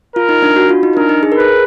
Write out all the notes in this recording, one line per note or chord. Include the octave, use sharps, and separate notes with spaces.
F4 A#4
D#4
D4
F#4
F4
D#4
D4 A#4
D#4
G#4
A#4
G#4 B4